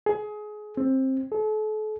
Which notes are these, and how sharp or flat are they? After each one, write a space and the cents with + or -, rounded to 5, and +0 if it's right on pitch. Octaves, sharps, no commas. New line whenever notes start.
G#4 +25
C4 +15
A4 -40